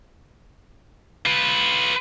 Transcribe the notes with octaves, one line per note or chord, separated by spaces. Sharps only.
F4 B4